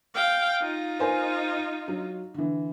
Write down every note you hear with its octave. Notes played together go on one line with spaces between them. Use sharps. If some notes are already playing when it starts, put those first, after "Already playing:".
F5 G5
D#4 F4
A#4 C5 G#5
F#3
D3 E3